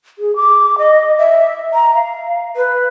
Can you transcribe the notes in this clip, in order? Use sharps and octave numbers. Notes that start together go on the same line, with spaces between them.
G#4
D6
D#5
E5
A#5
F5
B4